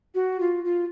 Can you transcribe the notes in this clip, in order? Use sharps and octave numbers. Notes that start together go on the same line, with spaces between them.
F#4
F4
F4